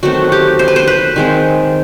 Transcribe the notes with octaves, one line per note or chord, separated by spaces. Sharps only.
D#3 F#3 A3 C4 F#4
G4
C5
B4
C5
B4
D#3 G#3 C4